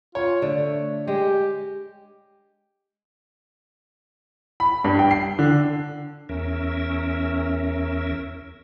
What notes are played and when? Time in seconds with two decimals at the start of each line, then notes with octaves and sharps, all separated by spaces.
0.15 F4 C#5
0.42 D3 A3
1.07 G#3 G4
4.60 B5
4.84 G2
4.99 G5
5.11 C7
5.39 D3
6.29 E2 C#4 A#4 E5